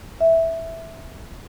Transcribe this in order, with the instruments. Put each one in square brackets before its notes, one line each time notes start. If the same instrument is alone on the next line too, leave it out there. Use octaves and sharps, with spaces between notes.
[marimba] E5